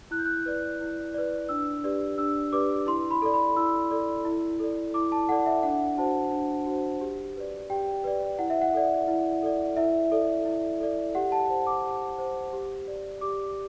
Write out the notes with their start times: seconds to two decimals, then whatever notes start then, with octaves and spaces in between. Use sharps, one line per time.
0.11 E4 F#6
0.19 G6
0.26 F#6
0.46 B4 D5
0.81 E4
1.14 B4 D5
1.49 D4 E6
1.84 G4 B4 D5
2.18 D4 E6
2.52 G4 B4 D5 D6
2.87 E4 C6
3.11 B5
3.22 A4 D5
3.34 B5
3.56 E4 E6
3.91 A4 D5
4.25 E4
4.60 A4 D5
4.94 E4 D6
5.12 A5
5.29 A4 F#5
5.32 D5
5.46 E5
5.63 D4 F#5
5.97 F#4 C5 A5
6.32 D4
6.67 F#4 C5
7.01 G4
7.36 B4 D5
7.70 G4 G5
8.04 B4 D5
8.38 E4 F#5
8.50 E5
8.62 F#5
8.74 A4 D5
9.08 E4
9.43 A4 D5
9.76 E4 E5
10.12 A4 D5
10.46 E4
10.80 A4 D5
11.15 G4 F#5
11.32 A5
11.49 C5
11.67 D6
11.85 G4
12.18 C5
12.53 G4
12.88 D5
13.21 G4 D6